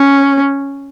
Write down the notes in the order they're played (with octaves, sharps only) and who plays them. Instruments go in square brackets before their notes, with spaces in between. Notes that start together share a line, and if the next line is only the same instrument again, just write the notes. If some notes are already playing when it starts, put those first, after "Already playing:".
Already playing: [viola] C#4